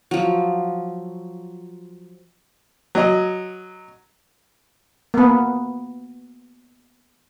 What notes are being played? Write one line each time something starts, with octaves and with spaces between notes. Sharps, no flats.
F3 F#3
F#3 D#5
A#3 B3